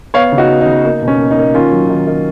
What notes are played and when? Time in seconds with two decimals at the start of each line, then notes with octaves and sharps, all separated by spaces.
0.14 B3 C#5 F5
0.32 C#3
0.38 D#4 F#4
0.49 B3
0.61 D#4
0.66 C#3
0.84 A#3 D#4
1.02 B2
1.08 C#4
1.20 A#3
1.31 D#4
1.37 A#3
1.54 D#3 C#4 F4
1.72 F#3
1.89 D#3
2.07 D#3